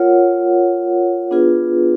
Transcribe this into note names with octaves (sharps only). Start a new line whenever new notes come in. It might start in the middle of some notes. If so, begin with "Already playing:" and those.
Already playing: F4 A#4 C#5 F#5
B3 D4 F4 G#4 B4